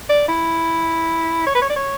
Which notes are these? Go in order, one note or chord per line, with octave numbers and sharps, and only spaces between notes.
D5
E4
C#5
B4
C#5
D5
C#5